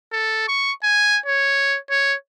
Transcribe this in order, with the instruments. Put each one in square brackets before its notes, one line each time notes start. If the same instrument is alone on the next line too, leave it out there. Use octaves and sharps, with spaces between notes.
[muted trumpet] A4
C#6
G#5
C#5
C#5